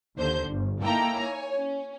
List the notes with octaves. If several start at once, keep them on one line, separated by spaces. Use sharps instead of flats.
D#2 D3 C5 G6
G1
A#3 D#4 E4 A4 G5 A#5
C#5 G#5
C#4